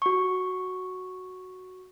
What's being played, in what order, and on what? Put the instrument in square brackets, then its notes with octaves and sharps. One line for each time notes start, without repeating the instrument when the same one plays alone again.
[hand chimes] F#4 C#6